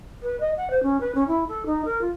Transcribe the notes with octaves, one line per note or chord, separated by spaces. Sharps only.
B4
D#5
F#5
C5
C#4
B4
C#4
E4
A4
D#4
A#4
F4